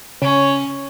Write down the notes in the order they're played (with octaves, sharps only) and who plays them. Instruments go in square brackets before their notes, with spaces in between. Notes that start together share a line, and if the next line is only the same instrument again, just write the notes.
[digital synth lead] C#3 [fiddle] C#4 C#5